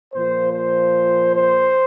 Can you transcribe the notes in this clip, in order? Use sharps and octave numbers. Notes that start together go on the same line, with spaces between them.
A#2 F3 C5
C5
C5